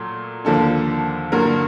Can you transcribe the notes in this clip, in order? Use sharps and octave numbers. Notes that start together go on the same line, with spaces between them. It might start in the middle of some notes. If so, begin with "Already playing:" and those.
Already playing: A#2 F#3 A3
D#2 D3 F3 A#3 D4 A4
G2 D3 F#3 A#3 A#4